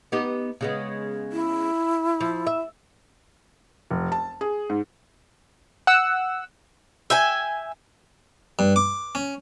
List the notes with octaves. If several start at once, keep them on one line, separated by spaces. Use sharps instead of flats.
B3 D#4 G4
C#3 G#3 B3
E4
F3
E5
F1
A5
G#4
G#2
F#5 E6
E5 G5 G#5
G2
D6
C#4